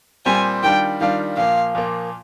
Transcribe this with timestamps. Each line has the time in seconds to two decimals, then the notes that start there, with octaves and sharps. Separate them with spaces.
0.26 A#2 G3 C4 G4 C5 G#5
0.63 D#3 G3 D4 F4 G5
1.01 D#3 G3 D4 F4 F5
1.37 A#2 F3 A#3 F5
1.75 A#2 F3 A#3